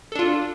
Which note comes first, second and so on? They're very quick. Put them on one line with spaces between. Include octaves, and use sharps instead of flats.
A4 D4 F4